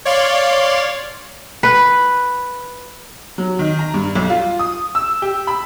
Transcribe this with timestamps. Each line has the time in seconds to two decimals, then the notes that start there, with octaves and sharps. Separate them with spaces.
0.05 C#5 D5 F5 C6
1.63 B4
3.38 F#3
3.59 D#3
3.79 A#5
3.94 G2
4.15 B1
4.30 F4
4.59 D#6
4.95 E6
5.22 G4
5.47 B5